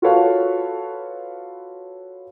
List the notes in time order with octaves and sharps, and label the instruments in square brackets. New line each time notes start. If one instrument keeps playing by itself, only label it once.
[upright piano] F4 F#4 A4 B4 C#5 F5